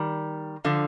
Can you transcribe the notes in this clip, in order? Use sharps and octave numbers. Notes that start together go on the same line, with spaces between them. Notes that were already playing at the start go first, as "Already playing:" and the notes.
Already playing: D#3 G3
D3 F3